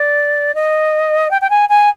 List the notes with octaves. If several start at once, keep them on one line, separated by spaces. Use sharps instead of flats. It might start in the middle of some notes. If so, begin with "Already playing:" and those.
Already playing: D5
D#5
G5
G5
G#5
G#5